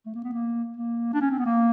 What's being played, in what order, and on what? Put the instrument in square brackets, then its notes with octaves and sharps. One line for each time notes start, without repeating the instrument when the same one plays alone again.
[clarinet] A3
A#3
B3
A#3
A#3
D4
C#4
C4
B3
A#3